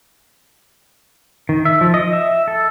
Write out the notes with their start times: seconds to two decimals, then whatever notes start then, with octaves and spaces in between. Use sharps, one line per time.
1.49 D#3
1.65 E5
1.81 F3
1.94 D#5
2.13 E5
2.48 A4